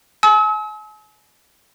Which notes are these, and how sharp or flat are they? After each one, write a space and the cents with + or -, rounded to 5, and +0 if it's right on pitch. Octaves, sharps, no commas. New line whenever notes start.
G#5 +40 E6 -45